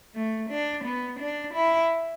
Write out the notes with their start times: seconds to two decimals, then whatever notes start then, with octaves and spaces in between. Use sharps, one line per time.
0.15 A3
0.50 D4
0.85 B3
1.20 D4
1.54 E4